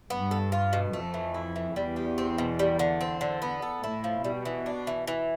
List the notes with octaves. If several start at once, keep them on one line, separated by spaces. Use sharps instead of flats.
G2 B3
A4
F4
B2
F2 A3
E3
E4
E3
E2 G3
G4
C4
B2
G3
D3
C4
D3
B3
A4
A2 E4
F3
B2 G3
E3
D4
E3
E3